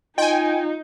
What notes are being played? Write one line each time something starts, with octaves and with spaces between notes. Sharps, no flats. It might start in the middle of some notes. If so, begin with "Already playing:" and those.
D#4 F4 D#5 G5 G#5 C6